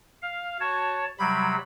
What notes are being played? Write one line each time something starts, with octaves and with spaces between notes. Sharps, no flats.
F5
F#4 C#5 A5
C3 F#3 G3 B5